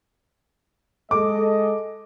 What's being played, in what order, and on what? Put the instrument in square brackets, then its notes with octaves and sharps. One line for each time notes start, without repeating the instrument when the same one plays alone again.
[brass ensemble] G#3 A4 D#5 [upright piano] D6